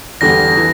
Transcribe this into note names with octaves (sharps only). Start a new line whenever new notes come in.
E2 D3 G3 A#6
E3